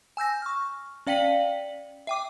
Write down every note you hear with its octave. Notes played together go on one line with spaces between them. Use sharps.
G#5 E6 G6 A#6
C#6 F6
C#4 D5 F5 G5 B6 F#7
E5 G5 D6